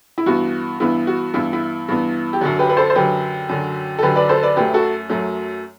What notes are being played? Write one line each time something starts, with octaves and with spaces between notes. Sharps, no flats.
E4
G2 E3 B3 F#4
G2 E3 B3 E4
F#4
G2 E3 B3 E4
E4
G2 E3 B3
G4
F#2 D3 F#3 F#4
G4 B4
B4
A4 C5
C5
F#2 D3 F#3 G4 B4
F#2 D3 F#3
A4
F#2 D3 F#3 G4 B4
B4 D5
A4 C5
B4 D5
F#2 F#3 A3 G4 B4
F#4 A4
F#2 F#3 A3